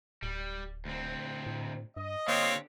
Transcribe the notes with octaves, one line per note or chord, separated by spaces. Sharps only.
D1 G3
D2 C4
A2
G2 D#5
D3 A#3 C4 G4 C#5 F5